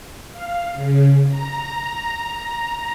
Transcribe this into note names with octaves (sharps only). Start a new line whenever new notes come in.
F5
C#3
A#5